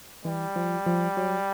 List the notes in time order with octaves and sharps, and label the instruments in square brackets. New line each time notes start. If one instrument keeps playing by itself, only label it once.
[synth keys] E3 [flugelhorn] G3
[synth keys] F3
F3
F#3